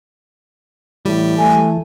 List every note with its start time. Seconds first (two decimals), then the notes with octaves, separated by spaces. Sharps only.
1.05 A2 E3 G3
1.38 A3 G#5